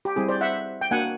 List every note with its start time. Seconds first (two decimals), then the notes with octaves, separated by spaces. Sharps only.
0.05 G4
0.16 G3 C4 E4 G#4
0.28 C5 D5
0.41 E5 F#5
0.81 G5
0.91 A#3 D4 F#4 F#5 G#5